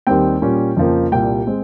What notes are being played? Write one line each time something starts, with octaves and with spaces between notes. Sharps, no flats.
D#2 D#3 G3 C4 G5
A#2 G3 C#4
F2 C#3 F3 A#3
C2 A#2 G3 G5
G#3 C4